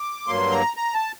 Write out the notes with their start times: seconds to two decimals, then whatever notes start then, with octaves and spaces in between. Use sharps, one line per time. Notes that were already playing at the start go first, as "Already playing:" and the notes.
Already playing: D6
0.27 G2 F#3 A#3 C6
0.52 A#5
0.77 A#5
0.94 A5